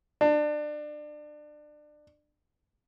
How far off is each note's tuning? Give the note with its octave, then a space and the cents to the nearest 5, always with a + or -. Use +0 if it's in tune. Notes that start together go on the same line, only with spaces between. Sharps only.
D4 +25